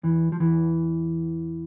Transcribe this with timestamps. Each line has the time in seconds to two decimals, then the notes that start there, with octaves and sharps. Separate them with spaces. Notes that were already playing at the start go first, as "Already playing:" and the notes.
0.03 E2 E3
0.32 F3
0.40 E2 E3